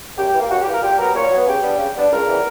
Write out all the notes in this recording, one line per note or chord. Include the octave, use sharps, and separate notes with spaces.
F#2 G4
E3
A#3
F#2 F#4
G4
E3 A#3 A#4
A#2 G4
F#3 B3 A#4
A#2 C#5
F#3 B3
C#3 G4
G3 B3 D4
C#3
G3 B3 D4
C#2 A#4
C#3 E3 G3 B3